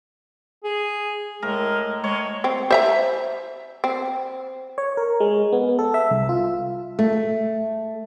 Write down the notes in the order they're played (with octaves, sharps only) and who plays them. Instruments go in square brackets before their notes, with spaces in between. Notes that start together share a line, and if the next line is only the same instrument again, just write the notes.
[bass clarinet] G#4
[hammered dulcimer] A2 A#4 [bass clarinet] G#3
[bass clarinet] G#3 [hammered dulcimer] C#5
[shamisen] C4
C5 E5 A#5
C4
[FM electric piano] C#5
A#4
G#3
B3
A4
E5
C2
F4
[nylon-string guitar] A3